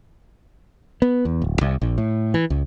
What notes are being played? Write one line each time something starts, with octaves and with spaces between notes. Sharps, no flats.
B3
E2
D1
C2
A#1
A2
E3
C#2